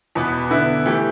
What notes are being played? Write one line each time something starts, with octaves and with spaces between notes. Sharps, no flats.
E2 B2 B3
D3 B3 E4
E3 A3 G4